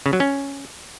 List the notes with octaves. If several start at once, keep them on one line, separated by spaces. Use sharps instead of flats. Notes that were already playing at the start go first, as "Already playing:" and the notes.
C#3
F#3
C#4